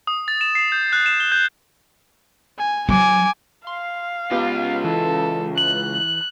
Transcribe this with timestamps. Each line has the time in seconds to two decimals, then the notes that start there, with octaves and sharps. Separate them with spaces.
0.07 D#6
0.28 A6
0.41 E7
0.55 C7
0.72 G6
0.93 F#6
1.06 E7
1.20 G7
1.32 G6
2.58 G#5
2.89 F#3 G#5 D6
3.67 F5 C6
4.31 C#2 B3 F4 G4
4.84 E3 A4
5.58 F#6 F#7